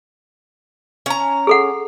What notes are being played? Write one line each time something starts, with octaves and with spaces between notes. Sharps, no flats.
C#4 A#5
G#4 A4 F#5